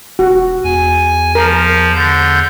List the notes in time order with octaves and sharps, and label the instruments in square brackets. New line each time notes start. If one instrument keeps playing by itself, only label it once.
[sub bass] E1 [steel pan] F#4
[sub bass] E2 [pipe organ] G#5
[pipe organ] F3 [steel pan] A#4
[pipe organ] D3 G6